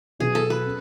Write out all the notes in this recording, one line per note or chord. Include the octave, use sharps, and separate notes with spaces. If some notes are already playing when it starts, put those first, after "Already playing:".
B2 F#3 B3 F#4 G#4
A4
B4
C#4